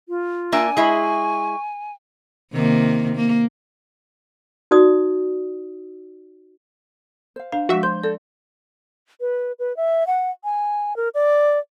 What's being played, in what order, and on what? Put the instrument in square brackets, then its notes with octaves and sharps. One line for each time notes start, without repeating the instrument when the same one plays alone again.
[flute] F4
[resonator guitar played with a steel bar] A#3 D4 E5 [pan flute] G#5
[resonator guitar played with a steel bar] G#3 E4 G#4 [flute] C#6
[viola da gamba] C3 D#3 A#3
A#3
[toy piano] D#4 F#4 D5 D#6
[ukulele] C5 F5
[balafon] D4 [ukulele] C5 [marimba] F5
[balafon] F3 G#3 [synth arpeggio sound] F#4 E5
[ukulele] C5 C#5 [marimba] C6 [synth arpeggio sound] G6
[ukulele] A4 [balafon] D5
[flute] B4
B4
E5
F#5
G#5
A#4
D5